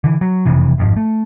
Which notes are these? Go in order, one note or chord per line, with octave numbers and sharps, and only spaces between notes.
D3 E3
F#3
F#1 F2 C3 E3
G1 F2 G#2
A3